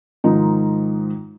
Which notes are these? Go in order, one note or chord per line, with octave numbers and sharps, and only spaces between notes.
G#2 D#3 F3 D#4